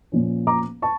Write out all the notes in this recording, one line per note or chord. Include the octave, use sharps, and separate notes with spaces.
A#2 F3 C#4
A#5 D6
A5 C#6